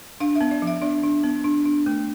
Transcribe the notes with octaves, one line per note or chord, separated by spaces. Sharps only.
D4 F5
E5
B3
D5
F3
E5
D4 D5
D4
B3
D4
D4
A3